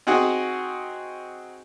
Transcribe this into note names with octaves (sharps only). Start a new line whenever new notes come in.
C4 D#4 F#4 G#4 F#5